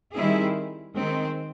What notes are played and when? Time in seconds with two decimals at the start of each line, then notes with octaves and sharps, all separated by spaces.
0.13 D#3 G3 C4 E4 G#4
0.95 D#3 G#3 C4